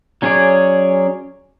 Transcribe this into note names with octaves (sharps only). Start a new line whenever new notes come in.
F#3 C#4 G#4 C#5 D5